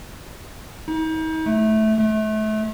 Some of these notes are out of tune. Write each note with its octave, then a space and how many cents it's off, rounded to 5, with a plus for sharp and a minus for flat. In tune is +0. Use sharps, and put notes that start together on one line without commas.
D#4 +40
A3 -15
A3 -30